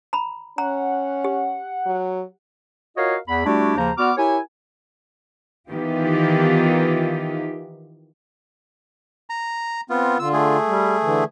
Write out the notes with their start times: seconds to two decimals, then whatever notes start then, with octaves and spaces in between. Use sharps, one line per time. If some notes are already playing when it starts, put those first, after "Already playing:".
0.13 A#5 B5
0.58 C#4 F#5 A#5
1.24 G4
1.86 F#3
2.97 F4 F#4 A#4 C#5 D#5 F5
3.28 E2 B5
3.46 G3 A3 D4 E4 F#4 G4
3.77 D#2 C#3 F3 A#3 C5 A#5
3.98 B3 F#4 D5 D6 F6
4.17 E4 G4 A#4 C#5 G#5
5.69 D#3 E3 B3 D#4 F4 G4
9.30 A#5
9.90 B3 C4 F4
10.19 D3 F4 E6
10.33 A3 G#4
10.67 G3
11.02 D3 E3